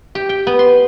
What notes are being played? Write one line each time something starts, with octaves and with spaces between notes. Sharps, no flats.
G4
G5
B3
C6